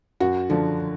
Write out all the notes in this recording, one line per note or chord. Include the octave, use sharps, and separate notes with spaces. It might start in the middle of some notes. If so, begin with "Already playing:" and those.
F#2 F#4
D3 F3